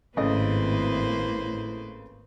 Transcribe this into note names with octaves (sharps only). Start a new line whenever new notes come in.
G#1 A2 C#3 A3 A#3 B4 C5 D#5